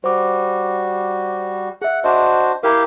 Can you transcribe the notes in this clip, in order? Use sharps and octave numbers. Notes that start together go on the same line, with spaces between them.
G3 F#4 C5 D6
G#4 E5 F#5
D4 F#4 C5 D#5
E4 G4 A#4 F5 A#5